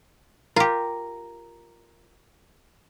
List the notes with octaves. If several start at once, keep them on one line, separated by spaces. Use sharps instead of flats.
F4 G4 A#4